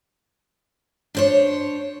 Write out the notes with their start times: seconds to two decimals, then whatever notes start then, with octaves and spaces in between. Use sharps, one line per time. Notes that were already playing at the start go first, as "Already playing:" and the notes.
1.15 D4 C5 C#5